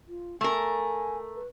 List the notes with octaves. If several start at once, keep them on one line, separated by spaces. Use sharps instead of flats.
F4
A3 A#4 G#5
B4